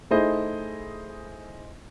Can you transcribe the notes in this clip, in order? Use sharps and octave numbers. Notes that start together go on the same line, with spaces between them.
A3 D#4 E4 G#4 C5 D#5